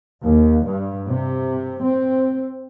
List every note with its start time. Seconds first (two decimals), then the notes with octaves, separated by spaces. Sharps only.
0.23 D#2
0.66 G2
1.08 C3
1.83 C4